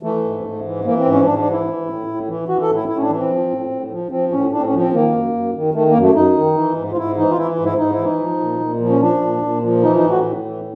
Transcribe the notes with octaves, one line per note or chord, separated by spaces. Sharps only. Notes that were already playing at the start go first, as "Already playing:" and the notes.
E3 A3
G#2
G#2
E3
E3 A#3
C4
G#2
C#4
G#2 D4
D4
E3
E4
E3
A2
A2
E3
E3 F#4
A4
A2
E4
A2 E4
C#4
D4
E3
C4
F3
A2
A2
F3
F3 C4
A2 C#4
A2 D4
C4
C#4
F3
C4
D#3 A#3
F#2
F#2
D#3
D#3 A3
A#3
F#2
A3
F#2 D#4
D#3
E3
G#2
F4
G#2 E4
E3 D#4
F4
E3 E4
G#2
E4
G#2 D#4
E4
E3
D#4
F3
A#2
A#2
F3
C#4
F3 D4
A#2
A#2
F3
E3 D#4
D#4
A2
F#4
A2
E3